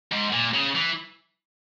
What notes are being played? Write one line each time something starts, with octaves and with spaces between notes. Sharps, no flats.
G#2
A#2
C#3
E3